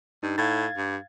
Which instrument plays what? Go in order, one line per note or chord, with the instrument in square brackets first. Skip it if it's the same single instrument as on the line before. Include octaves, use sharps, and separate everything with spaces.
[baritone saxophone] G2 [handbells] D#4
[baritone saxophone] A2 [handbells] F5 G#6 A6
[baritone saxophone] G2